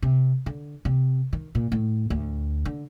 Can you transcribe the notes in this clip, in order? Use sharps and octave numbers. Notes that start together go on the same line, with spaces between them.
C3
D3
C3
D#3
A#2
A2
D2
D3